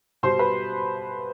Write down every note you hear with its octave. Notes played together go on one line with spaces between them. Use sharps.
B2 G3 C5 C6
B4 B5